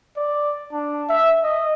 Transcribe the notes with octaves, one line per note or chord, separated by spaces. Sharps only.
D5
D4
E5
D#5